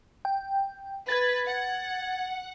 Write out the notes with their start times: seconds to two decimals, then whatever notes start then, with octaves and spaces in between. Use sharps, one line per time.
0.25 G5
1.09 B4 G#6 A6
1.47 F#5